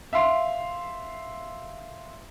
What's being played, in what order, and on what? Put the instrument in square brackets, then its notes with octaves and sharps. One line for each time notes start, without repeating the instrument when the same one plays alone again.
[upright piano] E5 F5 C6